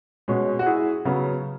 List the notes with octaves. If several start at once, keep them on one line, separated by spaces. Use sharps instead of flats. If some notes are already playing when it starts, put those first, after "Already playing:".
B2 G#3 C#4
F#4
E4 G#4
C#3 F#3 B3